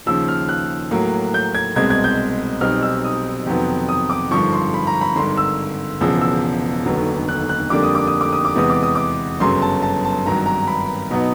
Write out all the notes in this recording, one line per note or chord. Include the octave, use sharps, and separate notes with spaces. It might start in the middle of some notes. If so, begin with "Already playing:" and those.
D#2 C#3 F3 E6
F6
F#6
A2 F#3 A#3
G6
G#6
C2 B2 G#3 C4 G#6
G#6
G6
B1 B2 G3 C4 D#4 F6
E6
D#6
F2 C3 D#3 F#3 B3
D#6
D6
G#1 G2 D3 F3 C#6
C6
B5
A#5
B5
G#1 G2 D3 C6
E6
E1 E2 C#3 F3 E6
E6
F1 D#2 D3 F#3 B3
F#6
F#6
F2 D3 G3 A#3 D4 D6
D#6
D6
D#6
D6
D#6
D6
E2 C3 E3 G#3 B3 D#6
D6
D#6
D6
G1 F#2 C#3 F#3 C6
A5
A5
A5
G#1 G2 D#3 F#3 A#5
A#5
B5
B2 F#3 B3 D#4